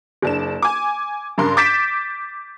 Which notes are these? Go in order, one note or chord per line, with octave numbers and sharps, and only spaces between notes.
F#1 D4 E7
G#5 D6
G2 C#3 A#4 C6
D6 G6 A6 B6 D7 E7